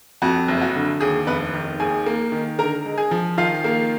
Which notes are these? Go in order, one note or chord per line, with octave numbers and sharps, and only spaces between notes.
F2 F#4
F#1
F#4
D3
D#2 G#4
F1 B3 B4
D#3
D#2 G#4 G#5
A#3
D#3
D3 A#4 A#5
G#3
G#4 G#5
F3
D#3 F4 F5
A#3